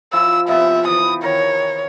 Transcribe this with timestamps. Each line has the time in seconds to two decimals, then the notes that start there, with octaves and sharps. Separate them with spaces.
0.13 F3 E4 E6
0.48 C3 F3 B3 E5
0.87 E3 D#6
1.23 D#3 C#5 A#5